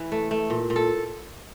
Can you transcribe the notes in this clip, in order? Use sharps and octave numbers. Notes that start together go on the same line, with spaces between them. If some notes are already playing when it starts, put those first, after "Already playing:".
Already playing: E3 E4
A3
A3
A#2
A#2
A4